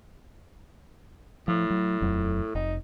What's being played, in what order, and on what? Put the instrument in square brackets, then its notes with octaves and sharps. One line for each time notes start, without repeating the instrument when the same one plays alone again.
[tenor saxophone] A2 [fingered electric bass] F3
[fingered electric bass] F#3
D#1 F2 F#3
[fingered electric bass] F1 [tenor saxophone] D#4